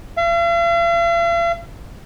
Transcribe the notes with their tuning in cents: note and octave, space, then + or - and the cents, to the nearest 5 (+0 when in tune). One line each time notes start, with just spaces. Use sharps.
F5 -45